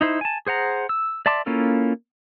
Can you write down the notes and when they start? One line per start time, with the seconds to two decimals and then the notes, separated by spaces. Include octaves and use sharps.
0.01 D#4 E4 C5
0.21 G#5 A5
0.47 G#4 C5 F#5 A#5
0.89 E6
1.26 D5 E5 A5 C6 D6
1.46 A#3 C#4 E4 F4 A4